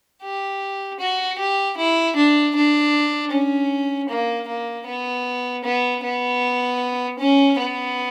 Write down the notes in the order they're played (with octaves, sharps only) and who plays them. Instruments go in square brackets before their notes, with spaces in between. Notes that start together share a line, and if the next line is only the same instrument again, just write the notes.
[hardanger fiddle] G4
F#4
G4
E4
D4
D4
C#4
A#3
A#3
B3
B3
B3
C#4
B3